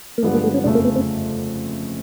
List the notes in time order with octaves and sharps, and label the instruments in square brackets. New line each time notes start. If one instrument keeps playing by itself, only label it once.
[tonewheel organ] A#3
[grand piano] G2 D3 F3 G#3 B3 [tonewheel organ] A3
[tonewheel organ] A#3
A3
C#4
[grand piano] F#1 F2 C#3 F3 A3 [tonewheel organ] D4
[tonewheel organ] A#3
B3
C4